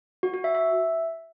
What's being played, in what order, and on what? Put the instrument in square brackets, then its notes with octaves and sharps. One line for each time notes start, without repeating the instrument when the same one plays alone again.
[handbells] F#4
F#4
E5
E5